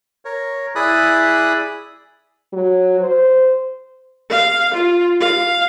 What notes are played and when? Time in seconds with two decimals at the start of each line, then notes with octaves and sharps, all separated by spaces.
0.25 A#4 C#5
0.75 E4 G#4 D5 B5 D#6 F#6
2.53 F#3
3.00 C5
4.30 F5
4.74 F4
5.20 F5